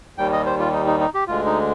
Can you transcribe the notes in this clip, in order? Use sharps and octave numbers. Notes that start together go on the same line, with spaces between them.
D#2 D#3 G3 G5
D#5
C5
F4
D#4
D#4
D#4
G4
D2 D3 G#3 F4
D#4